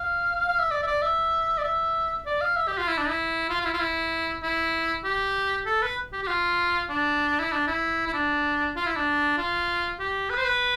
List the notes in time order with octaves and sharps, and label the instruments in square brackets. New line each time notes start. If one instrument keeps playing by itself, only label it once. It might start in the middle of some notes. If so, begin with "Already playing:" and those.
Already playing: [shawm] F5
F5
E5
D5
E5
D5
E5
D5
E5
D5
F5
E5
G4
F4
E4
D4
E4
F4
F4
E4
F4
E4
E4
G4
A4
B4
G4
G4
F4
D4
E4
D4
E4
E4
D4
F4
E4
D4
F4
G4
B4
C5
B4